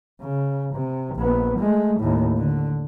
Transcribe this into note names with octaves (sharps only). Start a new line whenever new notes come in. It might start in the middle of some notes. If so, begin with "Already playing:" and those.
C#3
C3
A#1 B3
G#3 A3
D#2 A2
D3